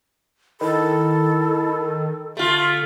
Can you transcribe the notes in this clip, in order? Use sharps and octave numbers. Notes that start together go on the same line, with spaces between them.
D#3 E4 A4
D3 A3 F4